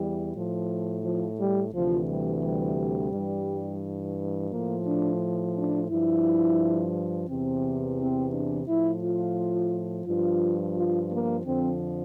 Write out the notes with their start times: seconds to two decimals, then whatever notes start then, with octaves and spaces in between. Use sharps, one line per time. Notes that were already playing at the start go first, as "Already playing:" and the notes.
Already playing: E2 E3 G3
0.36 A2 F3
1.04 F3
1.39 G3
1.74 D2 C3 E3 F3
2.08 G3
2.43 G3
3.13 G2 E3
4.51 A2 F3 A#3
4.87 D4
5.56 D4
5.90 G2 F3 E4
7.29 E2 C3 E3 C4
7.99 C4
8.33 D4
8.67 A2 F3 E4
9.02 F4
10.07 G2 F3 F4
10.75 F4
11.11 A#3
11.45 F2 D3 F3 C4